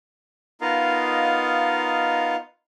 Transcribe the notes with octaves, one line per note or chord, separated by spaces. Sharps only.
B3 D#4 F4 A#4 D#5 F5